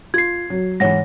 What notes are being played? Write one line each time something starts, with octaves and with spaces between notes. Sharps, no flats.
F4 G#6 C7
F#3
G#2 E3 C#5 F#5 A#6